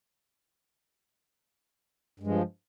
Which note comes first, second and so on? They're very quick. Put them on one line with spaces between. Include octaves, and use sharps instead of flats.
G2 G#3 F3